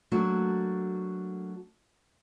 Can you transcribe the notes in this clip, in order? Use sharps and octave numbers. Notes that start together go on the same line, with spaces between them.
F#3 A3 A#3 D4 F#4